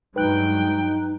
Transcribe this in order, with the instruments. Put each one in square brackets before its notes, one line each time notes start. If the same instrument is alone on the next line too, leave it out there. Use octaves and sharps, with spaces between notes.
[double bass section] G2 F#3 G#3 [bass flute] D#4 [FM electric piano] B4 F#6 [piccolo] G5